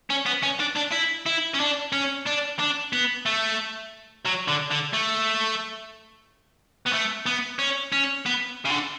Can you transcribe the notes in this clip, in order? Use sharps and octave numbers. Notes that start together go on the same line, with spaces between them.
C#4
B3
C#4
D4
D4
E4
E4
C#4
D4
C#4
D4
D4
B3
A3
F#3
D3
D3
A3
B3
A3
B3
C#4
C#4
B3
C#3
D3